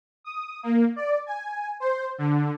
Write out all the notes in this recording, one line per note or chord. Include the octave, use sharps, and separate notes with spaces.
D#6
A#3
D5
G#5
C5
D3